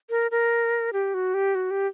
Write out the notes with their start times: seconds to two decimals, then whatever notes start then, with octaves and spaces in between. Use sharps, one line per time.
0.10 A#4
0.31 A#4
0.93 G4
1.14 F#4
1.34 G4
1.55 F#4
1.71 G4